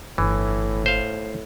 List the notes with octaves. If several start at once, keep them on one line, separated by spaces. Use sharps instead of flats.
G1 A2 E3
C5 F5